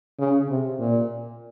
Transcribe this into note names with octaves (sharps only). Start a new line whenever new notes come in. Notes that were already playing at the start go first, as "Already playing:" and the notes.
C#3
C3
A#2